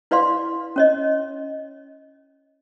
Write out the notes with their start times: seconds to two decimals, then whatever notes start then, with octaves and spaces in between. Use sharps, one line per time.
0.11 E4 B4 D5 F5 C6
0.76 C#4 C#5 D#5